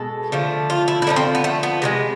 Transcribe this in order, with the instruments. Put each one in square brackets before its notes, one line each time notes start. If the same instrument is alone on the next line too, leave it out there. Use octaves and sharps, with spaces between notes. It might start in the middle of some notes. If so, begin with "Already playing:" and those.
Already playing: [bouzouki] B2 G#3 A4
D3 F3 A3
F4
E4
E4
D3 F3 A3 D4
C4
B3
A3
B3
C3 F3 G#3